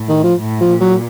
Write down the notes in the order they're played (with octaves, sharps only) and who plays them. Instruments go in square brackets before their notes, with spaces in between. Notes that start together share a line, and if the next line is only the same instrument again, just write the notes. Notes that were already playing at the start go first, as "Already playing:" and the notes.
Already playing: [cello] A2
[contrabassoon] D#3
F3
[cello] A2
[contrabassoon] F3
[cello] A#2
[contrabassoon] F#3